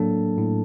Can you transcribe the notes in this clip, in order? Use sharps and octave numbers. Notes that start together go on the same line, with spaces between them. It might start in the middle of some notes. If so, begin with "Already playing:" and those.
Already playing: A2 F#3 A#3 D4 A4 A5
A2